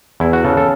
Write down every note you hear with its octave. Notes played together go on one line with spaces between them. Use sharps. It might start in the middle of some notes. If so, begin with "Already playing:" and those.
E2 E4
F#4
C#3 A4
A4